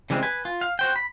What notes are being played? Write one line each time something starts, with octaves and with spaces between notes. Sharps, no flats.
C#3 E3 G3 G#3 C4
B4 G#5
F4
F5
F#4 C5 G5
B5